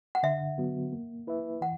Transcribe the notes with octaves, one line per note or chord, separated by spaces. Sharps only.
F#5
D3 E5
F#3 B3 F#4
A#3
E4 B4 E5
E3 F#5